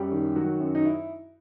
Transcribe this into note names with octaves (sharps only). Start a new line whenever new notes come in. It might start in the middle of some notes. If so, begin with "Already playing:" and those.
Already playing: F#2 G3 G4
D#3
D#3 F#3 F#4
F#2
D#4
E4